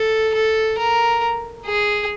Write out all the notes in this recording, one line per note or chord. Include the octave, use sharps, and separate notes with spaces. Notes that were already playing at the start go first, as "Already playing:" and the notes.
Already playing: A4
A4
A#4
G#4